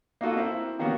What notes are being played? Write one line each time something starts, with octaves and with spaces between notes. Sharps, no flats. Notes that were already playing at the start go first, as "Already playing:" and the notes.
A#3 D#4 F4 F#4 A4
A#3 C4 E4
C3 D#3 A#3 B3 C#4 F#4